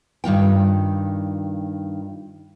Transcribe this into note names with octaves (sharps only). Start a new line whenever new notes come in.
G2 D#3 F4 G5